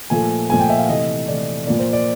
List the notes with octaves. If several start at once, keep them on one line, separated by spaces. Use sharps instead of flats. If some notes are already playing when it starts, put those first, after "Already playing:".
A#2 F3 A3 G#5
A#2 F3 A3 G#5
G5
E5
F5
C3 E3 A3 D#5
C3 E3 A3 D5
A#2 F3 A#3 D5
C5
D5